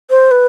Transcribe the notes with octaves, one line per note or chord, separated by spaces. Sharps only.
C5
B4